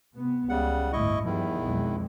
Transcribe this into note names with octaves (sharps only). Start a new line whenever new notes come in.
C3 B3
C#2 C#3 G3 F#5
G1 A2 E4 D#5 C#6
E2 G2 D#3 F3 G3 E4
B1 F2 G#3